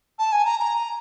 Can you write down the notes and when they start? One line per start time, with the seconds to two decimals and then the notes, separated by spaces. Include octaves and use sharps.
0.18 A5
0.32 G#5
0.45 A#5
0.59 A#5